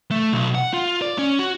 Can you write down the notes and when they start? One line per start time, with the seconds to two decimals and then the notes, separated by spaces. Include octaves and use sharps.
0.11 A3
0.32 B1
0.55 F#5
0.73 F4
1.02 D5
1.18 C#4
1.39 F#4